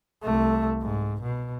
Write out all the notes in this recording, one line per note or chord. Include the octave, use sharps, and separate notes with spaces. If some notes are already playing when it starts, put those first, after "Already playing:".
C2 A3
G#2
B2